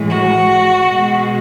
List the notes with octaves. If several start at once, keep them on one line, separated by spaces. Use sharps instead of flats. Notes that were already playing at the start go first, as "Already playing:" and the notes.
Already playing: A2 E3 G#3
F#4
B2 G#3